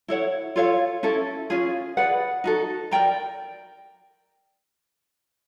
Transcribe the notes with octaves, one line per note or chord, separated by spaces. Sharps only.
E4 A4 C#5 F#5
F4 A4 C#5 F5
C#4 E4 A4
C#4 F4 G#4
G#4 B4 D5 F#5
D#4 F#4 A4
A#4 D5 G5 A#5